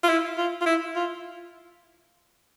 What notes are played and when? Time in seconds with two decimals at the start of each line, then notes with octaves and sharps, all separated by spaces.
0.03 F4
0.09 E4
0.38 F4
0.61 F4
0.66 E4
0.96 F4